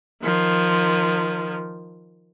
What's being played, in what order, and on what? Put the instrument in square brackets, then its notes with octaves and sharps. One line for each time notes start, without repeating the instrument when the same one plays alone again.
[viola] D#3 F3